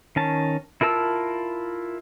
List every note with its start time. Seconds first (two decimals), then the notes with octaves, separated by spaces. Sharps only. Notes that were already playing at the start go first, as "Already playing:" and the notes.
0.16 D#3 C#4 A5
0.81 E4 F4 A#4 A5 E6